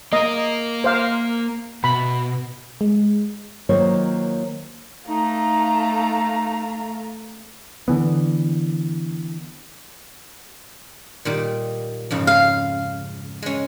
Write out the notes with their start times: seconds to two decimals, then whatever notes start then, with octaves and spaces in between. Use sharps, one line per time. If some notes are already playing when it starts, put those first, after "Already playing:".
0.13 A#3 A#4 D#5
0.84 C5 F5
1.84 B2 B5
2.81 G#3
3.69 D#3 F#3 A#3 F4 C5 C#5
5.08 A3 D#4 F5 A#5
7.88 D3 E3 B3
11.25 A#2 D#3 G3
12.11 F2 G#2 C#3
12.27 F5
13.42 G#3 C#4